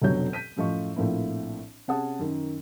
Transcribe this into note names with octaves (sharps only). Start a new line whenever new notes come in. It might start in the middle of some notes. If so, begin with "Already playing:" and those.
F1 B2 D3 F#3 C#5 G6
G6 B6 D#7
F#2 A2 F3 D#5 C#6
A#1 A2 F3 A#3 C4 E4
C3 C#4 G#4 F#5 A5 D#6
F#2 D#3